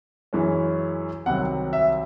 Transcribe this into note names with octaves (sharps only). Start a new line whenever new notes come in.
F#2 E3 G#3 C#4
C2 C3 D#3 F#3 F#5
E5